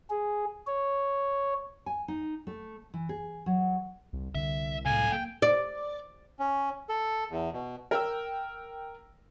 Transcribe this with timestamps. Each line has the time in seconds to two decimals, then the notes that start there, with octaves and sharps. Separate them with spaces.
0.10 G#4
0.67 C#5
1.86 G#5
2.08 D#4
2.47 A3
2.94 E3
3.09 G#4
3.46 F#3
4.13 C2
4.35 C2 D3 E5
4.86 A2 C3 A4 F5 G#5
5.12 A#3 G5
5.42 D5
6.39 C#4
6.89 A4
7.30 E2
7.53 B2
7.91 A#4 G5 E6